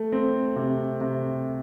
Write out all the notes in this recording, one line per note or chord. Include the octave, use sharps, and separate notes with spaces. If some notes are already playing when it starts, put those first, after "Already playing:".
Already playing: A3
C4
C3
C3